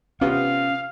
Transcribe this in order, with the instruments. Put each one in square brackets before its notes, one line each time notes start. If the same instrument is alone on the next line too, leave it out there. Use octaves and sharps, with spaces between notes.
[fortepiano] C3 B3 F4 [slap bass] C#4 [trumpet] F5